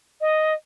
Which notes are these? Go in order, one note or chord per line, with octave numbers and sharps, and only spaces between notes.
D#5